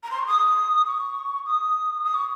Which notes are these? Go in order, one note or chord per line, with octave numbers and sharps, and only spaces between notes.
A#5
C6
C#6
D#6
C#6
D#6
D#6
C#6